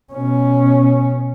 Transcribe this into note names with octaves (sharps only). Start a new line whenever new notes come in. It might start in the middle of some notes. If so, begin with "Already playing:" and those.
B2 C#4